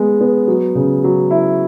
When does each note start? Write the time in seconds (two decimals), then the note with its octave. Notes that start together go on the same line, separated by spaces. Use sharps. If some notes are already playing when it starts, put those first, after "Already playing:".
Already playing: G#3 B3
0.21 B3
0.48 F#3
0.75 C#3
1.04 F#3
1.31 E4